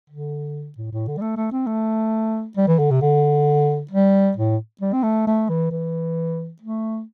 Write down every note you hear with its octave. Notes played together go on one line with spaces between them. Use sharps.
D3
A2
A2
D3
G3
A3
A3
C4
A3
G3
E3
D3
C3
D3
G3
A2
G3
C4
A3
A3
E3
E3
A3